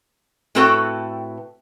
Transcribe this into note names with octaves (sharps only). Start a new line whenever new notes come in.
A2 C4 F#4 A4 B4 G5